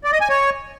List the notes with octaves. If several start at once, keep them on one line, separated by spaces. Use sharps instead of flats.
D5
D#5
G#5
C#5